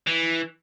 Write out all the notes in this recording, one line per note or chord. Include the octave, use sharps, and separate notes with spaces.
E3